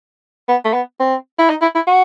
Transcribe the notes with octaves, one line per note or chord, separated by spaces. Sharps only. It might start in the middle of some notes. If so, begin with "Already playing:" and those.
B3
A3
B3
C4
E4
D#4
E4
E4
F#4